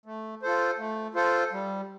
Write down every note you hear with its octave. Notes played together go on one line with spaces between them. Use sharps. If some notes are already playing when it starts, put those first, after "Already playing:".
A3
F4 A4 C5
A3
F4 A4 C5
G3